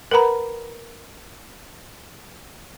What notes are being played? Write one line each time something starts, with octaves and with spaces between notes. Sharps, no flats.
A#4 B4 F#5 A#5 B5